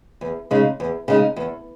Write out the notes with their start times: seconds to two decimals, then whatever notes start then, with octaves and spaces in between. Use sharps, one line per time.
0.21 E2
0.51 C#3 G#3 D#4
0.80 E2
1.08 C#3 G#3 D#4
1.36 E2